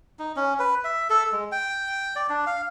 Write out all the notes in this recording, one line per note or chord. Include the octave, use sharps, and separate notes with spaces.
D#4
C#4
B4
E5
A4
G#3
G5
D5
D4
F5